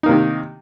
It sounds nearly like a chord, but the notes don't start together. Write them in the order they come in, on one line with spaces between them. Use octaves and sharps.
D#4 A#3 C3 D#3